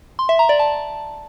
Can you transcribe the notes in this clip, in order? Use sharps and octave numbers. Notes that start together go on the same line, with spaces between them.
C6
E5
A#5
D5
A5